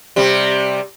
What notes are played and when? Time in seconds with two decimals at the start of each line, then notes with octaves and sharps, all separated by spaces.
0.16 C3 G3